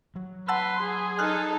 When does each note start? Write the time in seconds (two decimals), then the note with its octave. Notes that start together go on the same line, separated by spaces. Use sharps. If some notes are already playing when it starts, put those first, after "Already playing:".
0.16 F#3
0.48 B4 F#5 A5 C6 E6
0.83 G#4
1.19 D#4 A4 F6 F#6